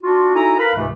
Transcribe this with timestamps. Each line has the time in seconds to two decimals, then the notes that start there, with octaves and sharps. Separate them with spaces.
0.02 D4 F4 F#4
0.35 D#4 E4 F#4 A4 G#5 A#5
0.58 A#4 B4 F5 B5
0.75 C#2 G#2 C3 E3 A3